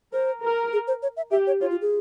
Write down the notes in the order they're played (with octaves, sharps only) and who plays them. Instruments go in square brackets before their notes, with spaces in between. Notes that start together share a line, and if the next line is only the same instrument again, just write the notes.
[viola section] A#4 [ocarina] C5
[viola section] A#4
[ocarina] G#4
C5
C#5
E5
[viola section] G4 [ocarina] E5
[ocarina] C#5
[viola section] F4 [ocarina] C#5
[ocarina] F4
G#4